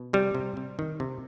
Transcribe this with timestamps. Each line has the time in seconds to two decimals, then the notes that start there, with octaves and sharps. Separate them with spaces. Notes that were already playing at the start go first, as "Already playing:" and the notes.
Already playing: B2
0.13 C3 G3
0.35 C3
0.57 C3
0.79 D#3
1.00 C3